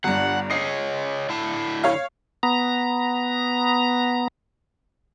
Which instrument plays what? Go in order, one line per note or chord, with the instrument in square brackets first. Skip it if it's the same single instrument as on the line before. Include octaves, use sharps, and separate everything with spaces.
[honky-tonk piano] G1 G2 [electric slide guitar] F#5
[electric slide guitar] G#4 C#5 D#5 [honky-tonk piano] C7
[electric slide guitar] D3 E4 A5
[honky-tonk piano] C#5 F5
[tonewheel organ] B3 A#5